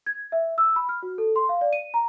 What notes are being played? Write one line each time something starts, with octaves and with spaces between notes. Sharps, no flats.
G#6
E5
E6
B5
F6
F#4
A4
C6
F5
D5
D#7
A#5